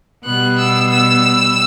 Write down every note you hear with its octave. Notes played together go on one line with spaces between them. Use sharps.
B2 G3 B3 F#6
E6
E6